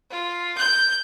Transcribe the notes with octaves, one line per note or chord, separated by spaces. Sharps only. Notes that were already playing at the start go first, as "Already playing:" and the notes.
F4
G6